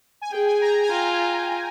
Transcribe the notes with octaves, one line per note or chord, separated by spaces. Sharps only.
G#5
G#4 G5
G#5
A#5
G#5
F4 A#5